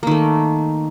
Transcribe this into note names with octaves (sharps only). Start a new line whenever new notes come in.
D#3 A3 A#3